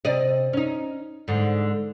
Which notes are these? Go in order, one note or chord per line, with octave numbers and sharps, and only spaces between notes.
C3 D5 D#5
C#4 D#4
G#2 D3